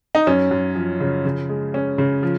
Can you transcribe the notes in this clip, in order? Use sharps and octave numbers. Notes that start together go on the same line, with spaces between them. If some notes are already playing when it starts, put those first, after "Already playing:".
D#4
F#2 C#4
F#2
F3
C#3
C#3
G#3
G#3 C#4
C#3
F3